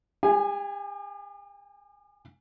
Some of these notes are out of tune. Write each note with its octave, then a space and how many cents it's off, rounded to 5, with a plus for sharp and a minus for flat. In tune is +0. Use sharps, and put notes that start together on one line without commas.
G4 +45 G#5 +0